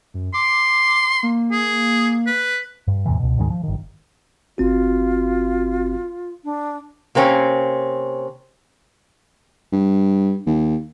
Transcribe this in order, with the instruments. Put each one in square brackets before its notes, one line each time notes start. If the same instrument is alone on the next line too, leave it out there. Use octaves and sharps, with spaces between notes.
[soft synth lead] F#2
[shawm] C6 [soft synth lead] D6
[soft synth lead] A#3
[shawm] G#4
B4
[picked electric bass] G2
E2 A2 C3 E3
C#2 B2
D2 G#2 D#3 G#3
F3
G1 D#3
[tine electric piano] G1 C4 F#4 [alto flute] F4
[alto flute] D4
[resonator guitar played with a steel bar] C3 A#3 C4 C#4
[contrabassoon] G2
D#2